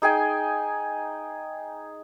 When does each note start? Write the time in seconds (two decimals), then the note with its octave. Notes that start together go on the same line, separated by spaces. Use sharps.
0.02 D#4 G#4 G5 G#5